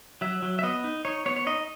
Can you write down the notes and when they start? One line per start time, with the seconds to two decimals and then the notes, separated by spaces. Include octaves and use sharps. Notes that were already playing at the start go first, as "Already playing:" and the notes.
0.21 F#3 E5
0.42 F#3
0.59 E5
0.63 B3 D#5
0.84 D#4
1.05 D#4 C#5
1.25 B3 C#5
1.36 C#5
1.47 D#4 D#5